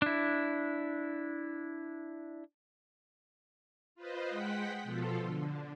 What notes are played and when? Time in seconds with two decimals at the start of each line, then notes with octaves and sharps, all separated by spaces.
0.02 D4 E4
3.95 F4 B4 C5 D#5
4.30 G#3 F#5 G5 B6
4.83 B2 F3 F4 A4
5.22 D3